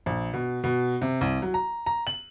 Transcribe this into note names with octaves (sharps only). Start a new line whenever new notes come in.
A#1
B2
B2
C3
C2
F#3
A#5
A#5
F#7